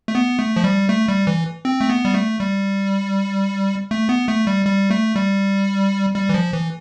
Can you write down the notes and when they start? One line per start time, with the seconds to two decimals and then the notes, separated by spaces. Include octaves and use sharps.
0.08 A3
0.15 B3
0.39 A3
0.56 F3
0.64 G3
0.89 A3
1.08 G3
1.27 E3
1.65 C4
1.81 A3
1.90 B3
2.05 G3
2.14 A3
2.40 G3
3.91 A3
4.09 B3
4.28 A3
4.47 G3
4.66 G3
4.91 A3
5.16 G3
6.15 G3
6.29 E3
6.34 F3
6.53 E3